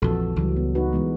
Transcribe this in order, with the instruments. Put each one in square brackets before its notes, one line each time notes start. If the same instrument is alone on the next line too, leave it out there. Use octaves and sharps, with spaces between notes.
[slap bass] A#1 F2 E3 [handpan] F#4 A4
[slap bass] C#2 [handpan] E3 F#3 G3
[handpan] B3
D#4 F#4 B4
E3 G#3 B3